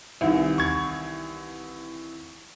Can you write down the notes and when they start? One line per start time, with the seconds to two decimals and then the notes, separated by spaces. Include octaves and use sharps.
0.21 C2 D#3 E3
0.58 C#6 G#6